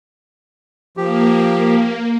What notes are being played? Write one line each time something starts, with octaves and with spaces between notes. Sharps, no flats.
F3 A#3 G4